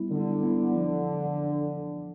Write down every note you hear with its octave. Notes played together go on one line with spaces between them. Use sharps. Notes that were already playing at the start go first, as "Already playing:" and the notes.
Already playing: G3 B3 E4
D3 G3
B3 E4
F3